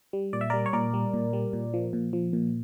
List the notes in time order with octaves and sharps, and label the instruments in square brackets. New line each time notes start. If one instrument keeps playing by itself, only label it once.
[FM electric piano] G3
A#2 D5
E5
G3 A#4 D5
C#5
A#2 A#4 D5
G3
A#2
G3
A#2
F3
A#2
F3
A#2